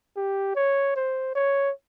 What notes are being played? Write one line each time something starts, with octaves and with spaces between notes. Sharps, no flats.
G4
C#5
C5
C#5